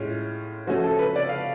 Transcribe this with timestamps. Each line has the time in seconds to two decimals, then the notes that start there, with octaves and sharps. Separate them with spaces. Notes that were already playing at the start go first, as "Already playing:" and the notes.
Already playing: A2 G#3 C#4 F4
0.67 F3 A3 C#4 F#4
0.84 A4
0.99 B4
1.16 D5
1.29 F5